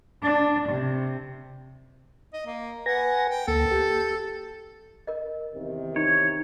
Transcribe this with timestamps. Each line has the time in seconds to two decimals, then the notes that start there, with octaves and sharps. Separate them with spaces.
0.24 D4
0.69 C3
2.33 D#5
2.46 A#3
2.86 B4 F#5 G#5 A#6
3.30 G5
3.48 D2 A#3 A4
3.71 G4
5.07 A#4 D#5
5.55 E2 C3 D#3
5.96 D#4 C#5